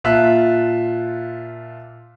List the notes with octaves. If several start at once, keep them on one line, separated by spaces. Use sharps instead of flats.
A#2 F4 E5 A5 F#6